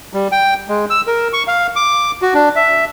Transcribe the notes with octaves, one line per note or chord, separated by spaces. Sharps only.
G3
G5
G#3
E6
A#4
C#6
F5
D6
F#4
D4
E5